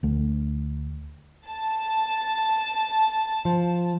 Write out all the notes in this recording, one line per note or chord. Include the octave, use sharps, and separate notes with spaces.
D2 A3
A5
F3